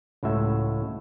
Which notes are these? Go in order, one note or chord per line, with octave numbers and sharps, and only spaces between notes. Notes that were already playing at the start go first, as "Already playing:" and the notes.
C#2 A2 F#4 E5